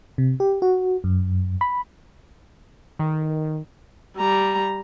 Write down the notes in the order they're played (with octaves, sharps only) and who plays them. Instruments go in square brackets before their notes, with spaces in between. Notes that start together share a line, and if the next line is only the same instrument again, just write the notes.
[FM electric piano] C3
G4
F#4
F#2
B5
[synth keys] D#3
[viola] G3 A#5